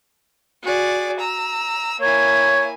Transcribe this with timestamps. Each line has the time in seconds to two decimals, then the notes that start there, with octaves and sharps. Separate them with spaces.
0.63 F#4 G#4 D5
1.20 A#5 E6
2.01 A#3 E4 C#5 G#5